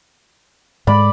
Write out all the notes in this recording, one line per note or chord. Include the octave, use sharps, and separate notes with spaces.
G#2 G#3 D5 B5